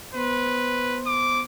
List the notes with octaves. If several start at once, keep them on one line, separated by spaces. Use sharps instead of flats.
B3 B4 C5 C6
D6